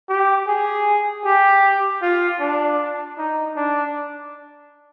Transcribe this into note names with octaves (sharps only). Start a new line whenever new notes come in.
G4
G#4
G4
F4
D4
D#4
D4